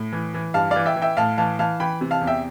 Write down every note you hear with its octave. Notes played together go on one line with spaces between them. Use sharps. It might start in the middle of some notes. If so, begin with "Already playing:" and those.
Already playing: A2
E3
E3
G2 F5 A5
E3 D5 F5
E5 G5
E3
E5 G5
A2 F5 A5
E3 F5 A5
E3 F5 A5
E3 G5 B5
C3
F5 A5
E2
E5 G5